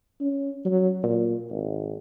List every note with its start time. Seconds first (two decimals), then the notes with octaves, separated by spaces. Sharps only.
0.21 C#4
0.65 F#3
1.03 A#2
1.51 G#1